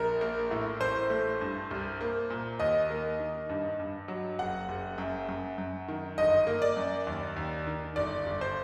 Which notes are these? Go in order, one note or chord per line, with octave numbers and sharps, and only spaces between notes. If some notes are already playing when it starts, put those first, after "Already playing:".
Already playing: A#1 A#4
A#3
A2
A1 C5
A3
G2
C2
A#3
A#2
D#2 D#5
A#3
D#3
G2
G2
F#3
F#1 F#5
F#1
F#2
F#2
F#2
D#3
G1 D#5
A#3
D5
F#2
D#2
D#2
D#3
G1 D5
G1
C5